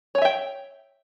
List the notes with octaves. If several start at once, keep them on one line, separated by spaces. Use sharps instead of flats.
C#5 E5 G5 G#5